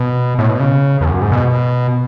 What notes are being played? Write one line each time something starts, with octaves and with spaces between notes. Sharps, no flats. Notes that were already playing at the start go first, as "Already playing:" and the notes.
Already playing: B2
A2
B2
C#3
E2
F#2
G#2
B2